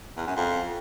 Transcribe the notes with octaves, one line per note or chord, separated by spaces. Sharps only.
E2
F#2
F2